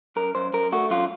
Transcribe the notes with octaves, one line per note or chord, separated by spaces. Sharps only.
F#2 A#4
F#2 C5
F#2 A#4
A3 F#4
F#2 F4